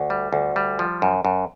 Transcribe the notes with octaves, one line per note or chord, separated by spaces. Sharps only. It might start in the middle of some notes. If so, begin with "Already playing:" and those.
Already playing: D2
G3
D2
G3
F3
F#2
F#2